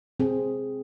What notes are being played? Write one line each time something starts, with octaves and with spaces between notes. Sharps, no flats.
C4 G#4